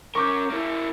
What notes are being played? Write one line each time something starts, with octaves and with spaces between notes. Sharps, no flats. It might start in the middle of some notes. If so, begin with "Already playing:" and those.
C#4 A#4 C#6 D6 G6
A#3 E4